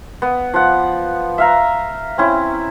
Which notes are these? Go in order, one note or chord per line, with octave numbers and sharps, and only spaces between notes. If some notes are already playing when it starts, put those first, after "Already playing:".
B3
F3 F#5
E5 F5 A#5
C4 C#4 E4 C#6